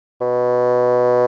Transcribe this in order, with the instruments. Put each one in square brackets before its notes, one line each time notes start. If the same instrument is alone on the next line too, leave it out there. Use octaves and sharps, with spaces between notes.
[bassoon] B2